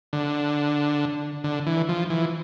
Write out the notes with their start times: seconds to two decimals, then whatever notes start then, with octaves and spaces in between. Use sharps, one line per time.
0.13 D3
1.44 D3
1.67 E3
1.89 F3
2.10 E3